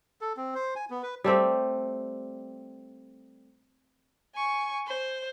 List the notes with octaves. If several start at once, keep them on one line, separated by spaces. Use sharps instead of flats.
A4
C4
C5
G#5
B3
B4
G3 A3 C4 G4
G#5 C#6
C5